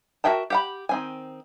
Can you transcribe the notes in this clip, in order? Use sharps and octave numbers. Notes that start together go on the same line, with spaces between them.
F#4 A#4 E5 G5 A5
G4 F#5 B5
D#3 C4 G#5